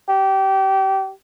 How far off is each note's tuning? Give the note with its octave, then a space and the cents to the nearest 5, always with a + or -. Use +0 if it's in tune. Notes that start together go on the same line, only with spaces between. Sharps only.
G4 -25